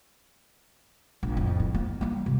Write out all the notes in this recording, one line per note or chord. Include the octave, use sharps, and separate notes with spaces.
A#1
F2 A2
E4
A#3
G3 A#3
C3